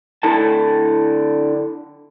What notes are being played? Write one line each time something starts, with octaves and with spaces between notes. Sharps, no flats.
D3 E4 A4 A5